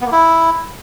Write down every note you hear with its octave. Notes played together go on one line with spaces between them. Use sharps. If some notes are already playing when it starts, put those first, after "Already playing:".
B3
A#3
E4